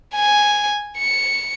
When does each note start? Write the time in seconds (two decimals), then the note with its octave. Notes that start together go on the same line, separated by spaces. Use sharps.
0.15 G#5
0.98 C#7